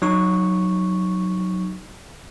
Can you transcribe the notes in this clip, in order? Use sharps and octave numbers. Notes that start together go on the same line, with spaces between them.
F#3 D#4 C#6